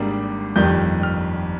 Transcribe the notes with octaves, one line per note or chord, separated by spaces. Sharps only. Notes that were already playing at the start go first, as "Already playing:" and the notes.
Already playing: G#1 G#2 G3 A#3 D4
G1 F2 D#3 G3 A#3 G6
F6